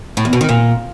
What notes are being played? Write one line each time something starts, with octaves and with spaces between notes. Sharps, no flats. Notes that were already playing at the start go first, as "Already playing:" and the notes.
A2
E2
B2
D#3
A#2